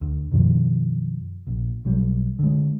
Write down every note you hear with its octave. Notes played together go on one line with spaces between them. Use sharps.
D2
F#2 B2 D#3 F3
A#1 A#2
B1 F#3 G3
D3 G#3